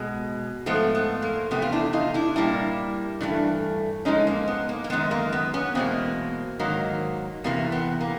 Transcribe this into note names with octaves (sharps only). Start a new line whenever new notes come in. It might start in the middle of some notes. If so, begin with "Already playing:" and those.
Already playing: B2 G#3
G#2 F3 A3 B3
B3
A#3
E2 C3 F3 A3 B3
F4
D4 E4
D#4 F4
D4 E4
A#2 G3 A#3 D4 E4
G2 E3 A3
G#2 F3 G#3 C#4 D#4
A#3
B3
A#3
A#3
F#2 D#3 G#3 B3
A#3
B3
B3 C#4
E2 B2 G#3 A#3 C4
G#2 D#3 F#3 A#3
E2 C3 E3 A#3
B3
A#3